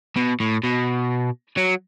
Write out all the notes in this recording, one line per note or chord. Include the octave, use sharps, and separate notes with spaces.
B2
A2
B2
F#3